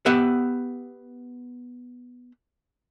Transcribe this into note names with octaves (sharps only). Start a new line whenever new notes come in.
B3 G4 E5 F#5